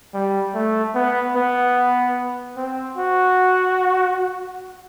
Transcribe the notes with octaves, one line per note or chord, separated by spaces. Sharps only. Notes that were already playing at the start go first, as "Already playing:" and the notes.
G3
A3
B3
B3
C4
F#4